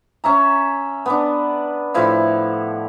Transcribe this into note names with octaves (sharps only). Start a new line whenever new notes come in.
C#4 E5 A#5
B3 D4
A2 F3 E4 F5